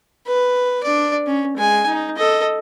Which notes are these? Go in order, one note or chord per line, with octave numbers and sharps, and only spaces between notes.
B4
D4 D5
C#4
G#3 G#5
D#4
A4 D#5